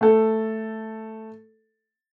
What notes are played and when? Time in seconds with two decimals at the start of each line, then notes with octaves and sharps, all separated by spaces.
0.01 A3 A4